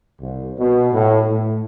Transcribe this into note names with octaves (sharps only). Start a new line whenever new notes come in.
C2
B2
A2
A2